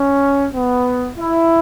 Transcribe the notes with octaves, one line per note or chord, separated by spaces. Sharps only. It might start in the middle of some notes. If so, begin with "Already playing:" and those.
Already playing: C#4
B3
E4